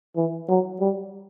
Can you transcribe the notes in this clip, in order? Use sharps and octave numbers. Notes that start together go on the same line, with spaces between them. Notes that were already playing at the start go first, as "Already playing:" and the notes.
E3
F#3
G3